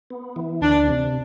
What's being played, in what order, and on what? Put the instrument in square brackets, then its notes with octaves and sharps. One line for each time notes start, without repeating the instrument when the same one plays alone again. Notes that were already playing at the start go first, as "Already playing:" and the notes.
[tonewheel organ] B3
E3
[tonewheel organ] D2 [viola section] D4
[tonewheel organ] C3